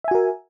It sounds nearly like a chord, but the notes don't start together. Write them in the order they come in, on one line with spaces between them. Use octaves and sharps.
E5 G#5 F#4 A#4